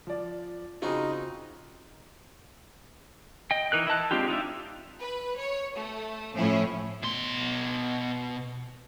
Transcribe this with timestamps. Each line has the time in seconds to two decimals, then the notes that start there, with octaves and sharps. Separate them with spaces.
0.07 F3 D5
0.82 C#3 C4 D#4 F4 F#4 G#4
3.51 D#5 G5
3.72 E3 D#4 A#4 F#6
3.87 E4 D#5 A5 F#6
4.11 G#3 C4 D4 F4 G4
4.28 D#4 F4 D5 E5
5.00 B4
5.39 C#5
5.76 A3
6.35 A2 F3 C#4 E4
7.02 B2 C6